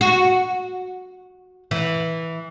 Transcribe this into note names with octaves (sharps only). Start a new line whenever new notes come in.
F#4
E3